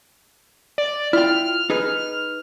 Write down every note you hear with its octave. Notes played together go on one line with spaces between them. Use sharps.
D5
E4 F4 G5 F6
D#4 G#4 B4